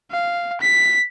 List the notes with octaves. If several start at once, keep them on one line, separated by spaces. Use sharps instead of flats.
F5
B6